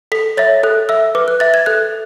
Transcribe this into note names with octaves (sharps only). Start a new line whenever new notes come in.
A4 B6
C#5 E5 A6
A4 F#6
E5 E6
B4 D6
F#6
E5 A6
G#6
A4 F#6